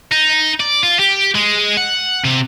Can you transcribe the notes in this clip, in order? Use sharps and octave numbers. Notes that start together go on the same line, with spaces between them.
D#4
D5
F4
G4
G#3
F#5
C3